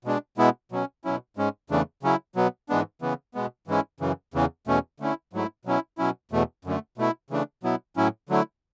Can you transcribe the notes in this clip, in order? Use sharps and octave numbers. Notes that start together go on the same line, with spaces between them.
B2 G#3 D4
B2 G#3 B3 E4
B2 F#3 C#4
B2 F#3 C#4 E4
G#2 G#3 C#4
E2 C#3 E3 A3 D4
C#3 F#3 C#4 E4
B2 F#3 B3
G#2 E3 G#3 B3 D4
C#3 E3 B3
B2 G#3 B3
G#2 E3 G#3 C#4 E4
F#2 C#3 E3
E2 C#3 E3
E2 B2 A3 C#4
D3 A3 C#4 E4
G#2 F#3 A3 E4
B2 F#3 C#4 E4
B2 F#3 C#4 E4
E2 B2 A3
F#2 D3 A3
B2 A3 E4
C#3 E3 A3 D4
B2 F#3 B3 E4
A2 F#3 C#4 E4
D3 F#3 A3 E4